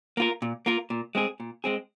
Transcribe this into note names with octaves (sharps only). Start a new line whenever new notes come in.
A#3 F4 A#4
A#2
A#3 F4 A#4
A#2
G#3 C4 G#4
A#2
G#3 C4 G#4